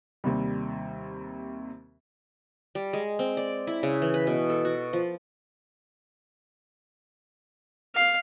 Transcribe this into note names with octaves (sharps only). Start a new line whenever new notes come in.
D#2 C3 G3
G3
G#3
C4
D5
E4
C#3
E3
B4
B2
A4
F#4
F3
F5